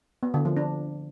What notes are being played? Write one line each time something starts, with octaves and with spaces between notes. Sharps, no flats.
B3
D3
F3
D4